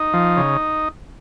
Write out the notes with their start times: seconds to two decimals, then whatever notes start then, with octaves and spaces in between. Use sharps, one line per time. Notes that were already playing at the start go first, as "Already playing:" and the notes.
Already playing: D#4
0.13 F3
0.37 C#3